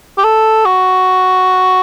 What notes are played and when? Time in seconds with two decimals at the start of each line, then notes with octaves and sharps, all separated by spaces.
0.18 G4
0.24 A4
0.65 F#4